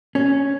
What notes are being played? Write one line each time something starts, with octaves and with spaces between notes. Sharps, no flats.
C#4